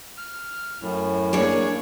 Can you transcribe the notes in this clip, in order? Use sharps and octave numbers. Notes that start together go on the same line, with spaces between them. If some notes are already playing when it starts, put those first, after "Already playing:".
F6
F#2 A2
A#3 D4 G#4 C#5